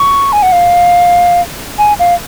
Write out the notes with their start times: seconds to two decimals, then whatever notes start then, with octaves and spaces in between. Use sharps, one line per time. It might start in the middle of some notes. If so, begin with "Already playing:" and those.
Already playing: C#6
0.33 G#5
0.43 F#5
0.52 F5
1.79 G#5
2.00 F5